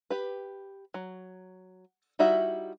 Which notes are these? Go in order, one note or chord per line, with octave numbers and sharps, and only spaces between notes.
G4 B4
F#3
G3 D#4 E4 F#4 E5